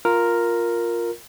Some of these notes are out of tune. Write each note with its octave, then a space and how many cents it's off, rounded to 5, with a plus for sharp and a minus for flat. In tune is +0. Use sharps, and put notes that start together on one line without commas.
F4 +5 A#4 +0